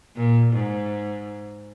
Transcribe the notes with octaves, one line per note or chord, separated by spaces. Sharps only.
A#2
G#2